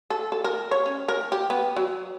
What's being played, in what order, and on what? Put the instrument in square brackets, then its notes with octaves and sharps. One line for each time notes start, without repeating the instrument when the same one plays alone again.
[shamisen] A4
A4
A#4
C#5
C#4
A#4
G4
B3
F#3